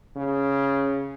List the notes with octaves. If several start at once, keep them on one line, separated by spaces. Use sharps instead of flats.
C#3